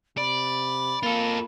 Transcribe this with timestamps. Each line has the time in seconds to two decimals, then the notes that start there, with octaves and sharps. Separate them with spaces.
0.17 C3 D5 B5
1.03 A#3 F4 A4